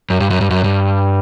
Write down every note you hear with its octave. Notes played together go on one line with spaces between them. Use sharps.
F#2
G2
F#2
G2
F#2
G2